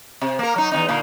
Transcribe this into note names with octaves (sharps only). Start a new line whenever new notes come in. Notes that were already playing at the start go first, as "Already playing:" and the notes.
C3
A#3 A#4
F#3 D#4
E2 C3 D#4
A#2 D3 A#3